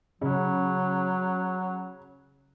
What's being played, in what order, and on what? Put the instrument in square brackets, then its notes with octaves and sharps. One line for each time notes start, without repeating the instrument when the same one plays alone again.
[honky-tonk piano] C#3 [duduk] F#3